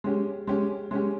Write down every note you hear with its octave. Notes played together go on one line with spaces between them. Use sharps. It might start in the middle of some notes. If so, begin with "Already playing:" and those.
G#3 C#4 G4
G#3 C#4 G4
G#3 C#4 G4